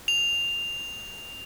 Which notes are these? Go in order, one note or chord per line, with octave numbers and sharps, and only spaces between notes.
F7